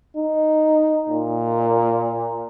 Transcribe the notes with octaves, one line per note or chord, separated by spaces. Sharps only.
D#4
A#2